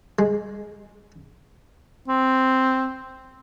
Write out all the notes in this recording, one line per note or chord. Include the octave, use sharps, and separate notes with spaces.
G#3
C4